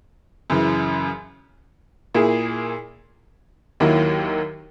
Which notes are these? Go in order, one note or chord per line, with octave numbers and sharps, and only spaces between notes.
F#2 C#3 E3
A#2 A#3 E4 G#4
D#2 D#3 F#3 A#3 E4